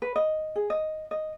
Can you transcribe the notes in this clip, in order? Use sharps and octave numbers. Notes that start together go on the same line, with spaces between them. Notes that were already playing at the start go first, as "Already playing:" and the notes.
B4
D#5
G#4
D#5
D#5